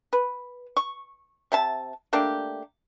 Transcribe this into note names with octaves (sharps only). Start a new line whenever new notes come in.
B4
C#6
C3 E5 A5
A3 A#3 D4 G4